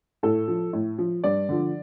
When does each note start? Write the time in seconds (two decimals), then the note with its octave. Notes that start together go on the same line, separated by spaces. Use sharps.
0.23 A2 A4
0.48 F3
0.73 A2
0.98 F3
1.24 G2 D5
1.49 D3 F3